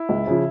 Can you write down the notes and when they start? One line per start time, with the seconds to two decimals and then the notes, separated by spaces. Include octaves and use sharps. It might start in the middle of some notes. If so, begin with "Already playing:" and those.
Already playing: E4
0.09 C#2
0.27 C#3 F3